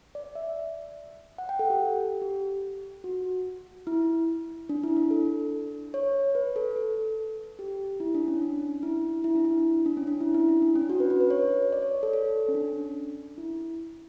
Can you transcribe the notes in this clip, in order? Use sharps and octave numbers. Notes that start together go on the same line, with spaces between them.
D5
E5
F#5
G5
A4
G4
G4
G4
F#4
E4
D4
E4
D4
A4
C#5
B4
A4
A4
G4
E4
D4
C#4
D4
E4
E4
D4
E4
D4
C#4
D4
E4
E4
D4
D4
C#4
F#4
B4
B4
B4
C#5
D5
C#5
A4
A4
C#4
D4
E4